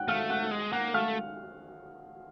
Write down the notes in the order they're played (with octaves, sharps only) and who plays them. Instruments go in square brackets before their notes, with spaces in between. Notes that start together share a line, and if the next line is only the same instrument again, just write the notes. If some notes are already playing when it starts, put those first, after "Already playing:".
Already playing: [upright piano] F#5 G5 F#6
[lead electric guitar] A3 [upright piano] F5 F6
[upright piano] F#5 F#6
[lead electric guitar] G#3
[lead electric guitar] A#3 [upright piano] F#5 F#6
[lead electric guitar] A3 [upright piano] F5 F6